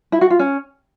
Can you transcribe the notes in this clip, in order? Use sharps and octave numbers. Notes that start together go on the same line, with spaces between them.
E4
F#4
F4
C#4